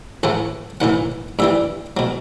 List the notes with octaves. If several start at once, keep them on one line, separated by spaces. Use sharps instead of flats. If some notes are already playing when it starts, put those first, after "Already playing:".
A1 A2 E3 A3 F#5
B1 A2 E3 F#5
G2 E3 G3 E5
B2 F#3